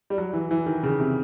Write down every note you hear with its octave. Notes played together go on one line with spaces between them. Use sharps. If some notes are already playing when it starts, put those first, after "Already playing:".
G3
F#3
E3
E3
D#3
C#3
C3